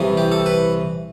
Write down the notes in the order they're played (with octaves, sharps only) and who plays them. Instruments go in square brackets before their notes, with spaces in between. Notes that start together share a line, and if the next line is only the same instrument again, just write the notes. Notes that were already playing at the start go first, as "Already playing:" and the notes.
Already playing: [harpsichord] C2 C3 E3
G4
A4
B4